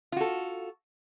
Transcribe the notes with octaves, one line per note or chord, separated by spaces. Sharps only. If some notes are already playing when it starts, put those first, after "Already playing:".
F4 F#4 A4